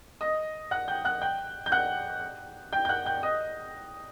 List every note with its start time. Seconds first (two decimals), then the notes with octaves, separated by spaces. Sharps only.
0.21 D#5 D#6
0.71 F#5 F#6
0.88 G5 G6
1.05 F#5 F#6
1.22 G5 G6
1.66 G6
1.72 F#5 F#6
2.73 G5 G6
2.85 G6
2.89 F#5 F#6
3.06 G5 G6
3.23 D#5 D#6